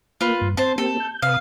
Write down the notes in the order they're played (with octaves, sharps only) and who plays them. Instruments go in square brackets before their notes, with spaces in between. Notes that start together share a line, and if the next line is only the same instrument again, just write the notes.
[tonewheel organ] A#3 [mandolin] F4 B4
[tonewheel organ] G2
[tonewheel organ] C4 [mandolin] C5 A5
[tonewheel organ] A#3 C4 G4 [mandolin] A4
[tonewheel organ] G6
[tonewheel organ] C3 B4 D#6 [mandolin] F5